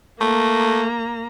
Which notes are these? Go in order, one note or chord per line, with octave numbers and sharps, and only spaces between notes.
A3 A#3 A#5